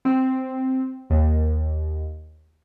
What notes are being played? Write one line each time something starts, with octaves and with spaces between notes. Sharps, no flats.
C4
D#2